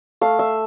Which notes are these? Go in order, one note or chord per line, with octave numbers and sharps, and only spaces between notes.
A3 F5
E5